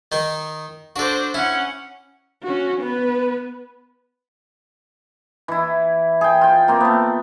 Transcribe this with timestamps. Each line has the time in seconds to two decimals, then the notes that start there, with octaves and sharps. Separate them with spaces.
0.12 D#3 D#4 A#4
0.96 D4 F#4 A4 C5
1.34 C#4 E4 F#5
2.44 C#4 F#4
2.81 B3 B4
5.48 E3 E4
6.21 G#4 G5
6.41 F4 G5
6.68 A#3 C4
6.80 A3 B3